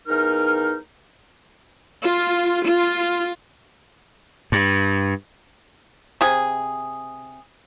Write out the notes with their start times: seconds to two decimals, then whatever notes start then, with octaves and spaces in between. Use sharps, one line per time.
0.08 E2 D#4 A#4 F6
2.05 F4
2.67 F4
4.52 G2
6.21 C3 G#4